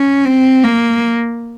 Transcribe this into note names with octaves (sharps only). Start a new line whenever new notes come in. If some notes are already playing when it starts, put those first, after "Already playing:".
Already playing: C#4
C4
A#3